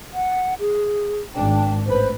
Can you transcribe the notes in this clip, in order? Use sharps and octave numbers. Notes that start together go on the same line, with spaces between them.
F#5
G#4
G#1 D4 G5
A1 B4 C5